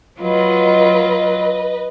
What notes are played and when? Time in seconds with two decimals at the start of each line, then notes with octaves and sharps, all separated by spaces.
0.21 F#3 F4 B4 D#5